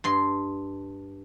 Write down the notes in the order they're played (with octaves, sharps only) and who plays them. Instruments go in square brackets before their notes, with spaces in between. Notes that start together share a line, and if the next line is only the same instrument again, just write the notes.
[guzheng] G2 C6